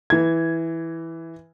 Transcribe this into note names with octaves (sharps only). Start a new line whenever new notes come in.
E3 G#6